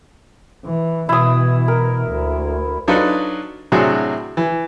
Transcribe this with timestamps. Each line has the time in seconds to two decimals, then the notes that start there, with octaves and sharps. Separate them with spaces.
0.65 E3
1.09 B2 E3 E4 D#6
1.68 A#4
2.09 D2
2.88 F#3 D4 D#4 F4 A4 B4
3.72 A2 C3 F#3 D4 F#4 G#4
4.37 E3